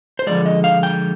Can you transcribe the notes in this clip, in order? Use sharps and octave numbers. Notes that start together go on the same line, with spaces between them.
C5
D3 F3 G#3 D5
D#5
F5
G5